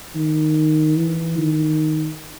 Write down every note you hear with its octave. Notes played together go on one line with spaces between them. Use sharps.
D#3
E3
D#3